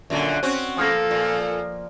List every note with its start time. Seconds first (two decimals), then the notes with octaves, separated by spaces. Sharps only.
0.10 F#2 A#2 D3
0.43 C4 C#4 F#4
0.77 F3 A#3 A4
1.11 A#2